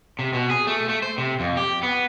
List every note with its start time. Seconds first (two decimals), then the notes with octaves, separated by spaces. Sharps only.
0.19 C3
0.33 B2
0.50 G#4
0.67 A3
0.89 A3
1.02 C5
1.18 C3
1.40 F2
1.57 G4
1.83 B3